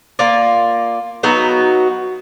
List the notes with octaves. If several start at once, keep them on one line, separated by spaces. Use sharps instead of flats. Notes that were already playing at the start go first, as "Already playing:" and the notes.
A#3 F4 D5
F#3 B3 D#4 F#4